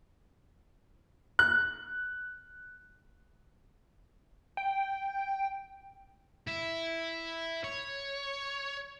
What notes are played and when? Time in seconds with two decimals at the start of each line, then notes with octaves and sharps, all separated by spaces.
1.39 F#6
4.57 G5
6.47 E4
7.64 C#5